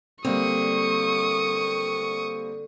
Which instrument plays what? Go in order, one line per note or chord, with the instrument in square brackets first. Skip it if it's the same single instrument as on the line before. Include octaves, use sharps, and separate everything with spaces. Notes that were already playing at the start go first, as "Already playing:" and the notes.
[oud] D3 [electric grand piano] G3 A#3 C4 [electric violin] C#6 D#6